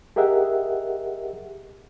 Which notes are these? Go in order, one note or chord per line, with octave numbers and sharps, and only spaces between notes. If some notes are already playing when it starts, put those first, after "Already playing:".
G4 G#4 A#4 D#5 E5 F#5